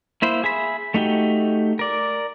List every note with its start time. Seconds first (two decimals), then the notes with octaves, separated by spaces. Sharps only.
0.22 A#3 E4 C5
0.44 G#4 E5 B5
0.94 A3 D#4 F#4 G4
1.79 A#4 D5